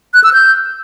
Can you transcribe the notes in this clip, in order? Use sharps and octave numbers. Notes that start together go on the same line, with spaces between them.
F#6
E6
G6